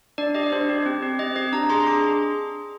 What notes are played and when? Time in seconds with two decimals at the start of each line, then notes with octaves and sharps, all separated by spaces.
0.18 D4 D5
0.35 G4 D#5
0.43 D5
0.52 D4 C5
0.69 G4
0.86 C4
1.02 G4
1.19 C4 D#5
1.36 G4 D#5
1.53 D4 A#5
1.70 G#4 C6
1.80 C6
1.86 D4 D6
2.04 G#4